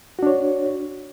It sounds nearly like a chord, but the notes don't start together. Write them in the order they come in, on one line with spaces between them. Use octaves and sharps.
F#4 D4 C#5